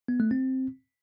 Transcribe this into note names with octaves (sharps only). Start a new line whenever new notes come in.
B3
A3
C4